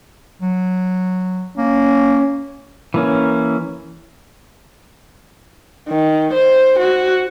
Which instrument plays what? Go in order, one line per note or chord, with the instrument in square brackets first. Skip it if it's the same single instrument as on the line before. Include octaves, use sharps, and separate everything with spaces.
[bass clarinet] F#3
[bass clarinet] A#3 [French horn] C#4
[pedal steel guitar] E3 A#3 C#4
[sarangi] D#3
C5
F#4